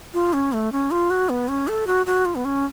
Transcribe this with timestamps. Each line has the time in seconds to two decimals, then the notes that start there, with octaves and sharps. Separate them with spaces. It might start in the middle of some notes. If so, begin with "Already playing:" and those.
0.14 F4
0.33 C#4
0.53 A3
0.72 C#4
0.91 F4
1.10 F#4
1.29 B3
1.48 C#4
1.68 A4
1.87 F#4
2.06 F#4
2.25 F4
2.35 B3
2.45 C#4